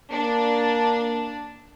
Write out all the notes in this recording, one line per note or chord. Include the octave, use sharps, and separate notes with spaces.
A#3 D4